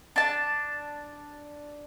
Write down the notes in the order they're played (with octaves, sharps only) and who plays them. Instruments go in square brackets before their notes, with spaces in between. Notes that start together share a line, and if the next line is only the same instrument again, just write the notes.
[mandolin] D4 A5